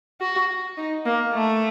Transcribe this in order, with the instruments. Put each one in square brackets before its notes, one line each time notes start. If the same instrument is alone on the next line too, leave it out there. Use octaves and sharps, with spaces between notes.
[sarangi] F#4
D#4
A#3
A3